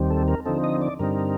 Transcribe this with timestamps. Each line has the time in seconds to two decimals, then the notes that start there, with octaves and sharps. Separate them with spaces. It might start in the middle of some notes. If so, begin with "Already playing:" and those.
Already playing: D#2 D#3 G3 C4
0.10 A4
0.28 A#4
0.45 D3 F3 C4 D#4 A4
0.64 D#5
0.81 D5
0.99 G2 D3 G3 C4 D#4 A#4